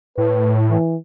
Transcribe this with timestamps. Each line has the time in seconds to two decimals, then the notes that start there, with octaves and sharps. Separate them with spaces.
0.18 A2 B4
0.70 E3